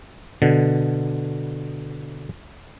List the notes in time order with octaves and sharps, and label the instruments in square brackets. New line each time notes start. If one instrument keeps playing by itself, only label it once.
[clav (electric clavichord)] B2 D3